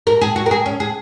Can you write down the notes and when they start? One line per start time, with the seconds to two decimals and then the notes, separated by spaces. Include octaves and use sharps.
0.07 A#4
0.21 G#4
0.36 F#4
0.46 A#4
0.51 G#4
0.66 C#4
0.80 G#4